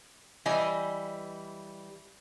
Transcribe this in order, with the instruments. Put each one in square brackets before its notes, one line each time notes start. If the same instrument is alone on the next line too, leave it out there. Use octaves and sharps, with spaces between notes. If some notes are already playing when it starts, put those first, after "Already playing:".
[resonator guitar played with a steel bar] E3 G3 D#5 G#5